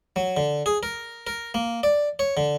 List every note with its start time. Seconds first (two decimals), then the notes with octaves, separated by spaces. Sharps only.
0.16 F#3
0.37 D3
0.66 G#4
0.83 A#4
1.27 A#4
1.54 A#3
1.83 D5
2.19 C#5
2.37 D3